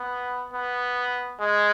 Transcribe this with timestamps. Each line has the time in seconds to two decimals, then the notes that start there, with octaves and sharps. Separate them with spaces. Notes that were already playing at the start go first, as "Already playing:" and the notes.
Already playing: B3
0.54 B3
1.40 G#3